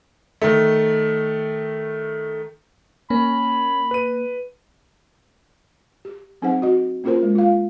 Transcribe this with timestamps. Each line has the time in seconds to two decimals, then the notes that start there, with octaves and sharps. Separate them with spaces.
0.42 D#3 A3
3.10 A#3 C#4 B5
3.91 B4 D#7
6.05 G4
6.42 F#3 C4 D#4 G#4 C5 F#5
6.62 F#4 D#5
7.04 A#3 C#4 F4 G#4 A#4 C5
7.23 G#3
7.35 F4 F5